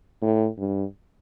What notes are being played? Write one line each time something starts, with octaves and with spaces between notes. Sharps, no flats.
A2
G2